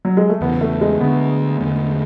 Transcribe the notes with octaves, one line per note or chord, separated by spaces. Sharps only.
F#3
G#3
A3
E2 C#3 E3 B3
A3
G#3
D3 A3 B3 D4
E2 D3 A3